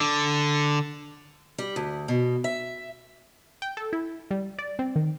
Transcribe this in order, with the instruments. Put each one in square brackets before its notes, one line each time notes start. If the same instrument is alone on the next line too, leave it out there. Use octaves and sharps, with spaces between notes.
[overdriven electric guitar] D3
[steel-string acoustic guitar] G3
D2
B2
E5
[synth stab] G5
A4
E4
G3
D5
C4
D#3